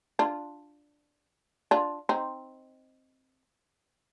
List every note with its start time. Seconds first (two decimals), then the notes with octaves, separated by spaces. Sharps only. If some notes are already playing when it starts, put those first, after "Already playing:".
0.19 D4 F4
1.71 D4 F4
2.09 C4 D#4